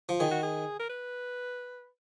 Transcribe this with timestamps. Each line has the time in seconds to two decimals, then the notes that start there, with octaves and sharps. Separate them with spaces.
0.09 F3
0.20 D#3 G#4
0.31 F#4
0.43 G#4
0.79 A#4
0.90 B4